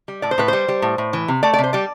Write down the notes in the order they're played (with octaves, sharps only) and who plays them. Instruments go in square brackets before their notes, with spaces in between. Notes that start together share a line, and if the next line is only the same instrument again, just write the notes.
[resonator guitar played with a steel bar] G3
A2 D5
C5
A2 B4
G3 C5
G3
A2
A2
E3
C3
A3 D5
D5
C3
C5
G3 D5